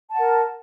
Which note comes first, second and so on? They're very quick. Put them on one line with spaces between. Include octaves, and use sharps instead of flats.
A5 F#5 A#4